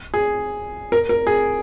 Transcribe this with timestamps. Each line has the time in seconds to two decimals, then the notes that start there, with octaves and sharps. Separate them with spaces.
0.14 G#4
0.92 A#4
1.09 A#4
1.27 G#4